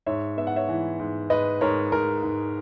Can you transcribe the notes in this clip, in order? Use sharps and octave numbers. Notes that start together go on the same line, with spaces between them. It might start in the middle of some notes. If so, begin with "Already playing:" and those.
G#2 C#5 E5
B3 E5
F#5
C#5 E5
E3
G#2
G#2 B4 D#5
G#2 A#4 C#5
G#2 A#4
G#2